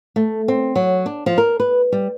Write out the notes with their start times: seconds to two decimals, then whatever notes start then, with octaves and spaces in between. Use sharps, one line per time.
0.16 A3
0.48 C4
0.76 F#3
1.06 D4
1.26 F3
1.38 A#4
1.60 B4
1.92 G3